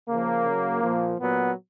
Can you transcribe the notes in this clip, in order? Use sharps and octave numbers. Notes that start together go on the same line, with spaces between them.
C#3 F3 A#3
C#3 F#3
A#2 F3
A#2 F#3 B3